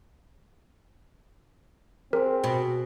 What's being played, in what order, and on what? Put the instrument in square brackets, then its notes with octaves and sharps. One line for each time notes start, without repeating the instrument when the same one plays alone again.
[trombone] C4 [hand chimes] G#4 C5 [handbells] A#4
[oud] B2